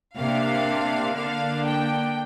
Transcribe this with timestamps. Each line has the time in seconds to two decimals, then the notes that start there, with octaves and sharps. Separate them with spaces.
0.18 C3 A#3 D4 F5
1.16 D3 A#3 D4 F5
1.65 G5